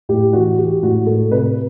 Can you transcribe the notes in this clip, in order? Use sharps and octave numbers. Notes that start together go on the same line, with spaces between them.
A2 G4
E3 F#4
E3 G4
A2 F#4
A2 A4
C3 B4